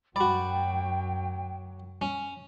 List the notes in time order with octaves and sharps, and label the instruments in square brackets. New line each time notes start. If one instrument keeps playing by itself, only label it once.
[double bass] F#2 F#3 [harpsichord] F#4 D5 [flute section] G5 [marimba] B5
[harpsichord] C#4